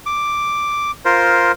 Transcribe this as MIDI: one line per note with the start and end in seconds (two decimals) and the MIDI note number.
0.06 0.91 86
1.05 1.52 65
1.05 1.52 70
1.05 1.52 72